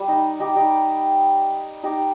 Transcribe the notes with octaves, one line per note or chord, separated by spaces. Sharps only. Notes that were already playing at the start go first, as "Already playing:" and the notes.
Already playing: G3
D#4
D#4 G4
D#4 G4
D#4 G4